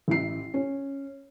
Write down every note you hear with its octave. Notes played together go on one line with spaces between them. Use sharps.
A1 E4 C7
C#4